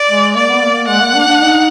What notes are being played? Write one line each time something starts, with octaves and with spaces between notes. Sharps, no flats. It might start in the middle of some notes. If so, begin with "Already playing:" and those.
Already playing: D5
G#3
A#3 D5
B3
A#3
G#3 F#5
A#3
D4
D4
D#4